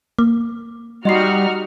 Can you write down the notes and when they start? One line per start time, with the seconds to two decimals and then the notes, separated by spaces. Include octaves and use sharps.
0.19 A#3 D6
1.05 G3 D#4 F#4 D#5 C6 F6 C7